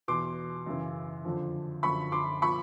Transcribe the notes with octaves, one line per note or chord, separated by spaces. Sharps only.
E2 B2 C6 D6
F#2 C#3 E3
F2 D3 F3
F#2 D3 F3 B5 C#6
C6 D6
A#2 F3 B5 C#6